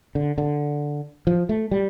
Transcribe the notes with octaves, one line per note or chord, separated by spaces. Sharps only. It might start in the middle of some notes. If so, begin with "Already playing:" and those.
D3
D3
F3
A3
G3